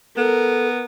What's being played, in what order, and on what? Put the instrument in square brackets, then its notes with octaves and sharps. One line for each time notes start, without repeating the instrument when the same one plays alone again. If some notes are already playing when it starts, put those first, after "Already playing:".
[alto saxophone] B3 [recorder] A4 [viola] A#4